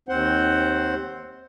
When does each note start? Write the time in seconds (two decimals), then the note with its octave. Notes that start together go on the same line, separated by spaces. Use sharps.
0.09 D#2 C4 C5 F#5